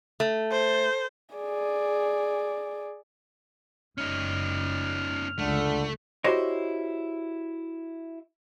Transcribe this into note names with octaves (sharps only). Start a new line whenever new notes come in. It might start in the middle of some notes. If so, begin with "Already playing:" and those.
A3
C5
G#4 D5
F#1 C#4 D#4 F6
C#2 D3 A3
E4 F#4 G4 C5 C#5 D#5